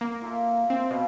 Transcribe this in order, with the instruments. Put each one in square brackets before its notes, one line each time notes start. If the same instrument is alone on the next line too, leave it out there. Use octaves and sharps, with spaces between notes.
[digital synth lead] A#3
[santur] F4 A4 E5
[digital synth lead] C4
[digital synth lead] B2 [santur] F5